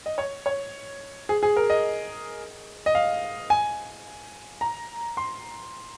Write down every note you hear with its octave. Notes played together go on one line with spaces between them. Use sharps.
D#5
C#5
C#5
G#4
G#4
A#4
D#5
D#5
F5
G#5
A#5
C6